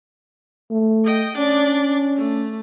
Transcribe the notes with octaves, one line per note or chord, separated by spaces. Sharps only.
A3
D#5 G5
C#4 D4 D5
A3